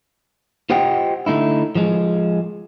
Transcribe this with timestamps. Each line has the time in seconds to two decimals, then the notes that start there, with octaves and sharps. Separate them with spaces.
0.70 F4 G4 C5 D#5 F#5 G5
1.26 D3 A3 D#4 E4
1.75 F3 G#3